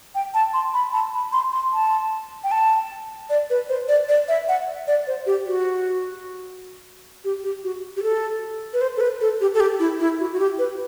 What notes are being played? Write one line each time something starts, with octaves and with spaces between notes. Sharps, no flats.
G5
A5
C6
B5
A5
B5
C6
C6
A5
G5
A5
D5
B4
C5
D5
D5
E5
F#5
D5
C5
G4
F#4
G4
G4
F#4
G4
A4
B4
C5
A4
B4
A4
G4
A4
G4
E4
E4
F#4
F#4
G4
B4